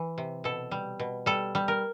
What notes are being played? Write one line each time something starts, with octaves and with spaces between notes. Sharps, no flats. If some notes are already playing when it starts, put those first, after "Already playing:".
Already playing: E3
C3
B2 A4
G3
B2
G3 A4
G3
A#4